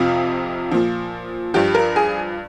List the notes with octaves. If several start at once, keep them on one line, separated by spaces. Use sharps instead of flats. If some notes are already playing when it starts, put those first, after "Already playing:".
Already playing: F2 C3 F3 F4
A#2 F3
G2 F3 G4
A#4
G#4